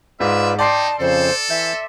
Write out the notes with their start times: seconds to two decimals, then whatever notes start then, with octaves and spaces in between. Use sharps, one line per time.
0.20 G#2 F4 B4 D5 E5
0.59 D#4 D5 G5 A5 C6 C7
1.00 F2 C#3 A4 C5
1.50 E3 E5 G6